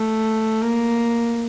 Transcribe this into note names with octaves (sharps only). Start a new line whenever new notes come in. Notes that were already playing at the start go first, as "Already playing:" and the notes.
Already playing: A3
A#3